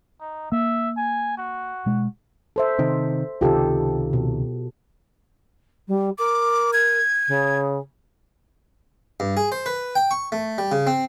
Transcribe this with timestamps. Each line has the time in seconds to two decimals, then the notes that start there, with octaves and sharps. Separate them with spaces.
0.20 D#4
0.52 A#3 E5
0.97 G#5
1.38 F#4
1.86 B2 G#3
2.56 A4 C5 E5
2.79 C3 D#3
3.41 C#2 C3 D#3 F4 G4 A4
4.13 B2
5.88 G3
6.18 A#4 D6
6.73 G#6
7.28 C#3
9.20 G2
9.37 G#4
9.52 C5
9.66 B4
9.95 G5
10.11 C#6
10.32 A3
10.58 G3
10.72 C#3
10.87 C4